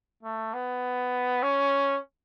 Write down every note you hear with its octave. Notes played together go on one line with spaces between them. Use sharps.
A3
B3
C#4